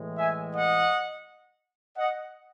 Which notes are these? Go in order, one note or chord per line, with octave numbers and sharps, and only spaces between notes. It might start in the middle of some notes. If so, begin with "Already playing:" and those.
Already playing: A2 E3 G#3
E5 G#5
D#5 F#5
D#5 F#5